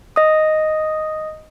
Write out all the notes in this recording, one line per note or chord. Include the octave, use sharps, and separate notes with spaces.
D#5 D#6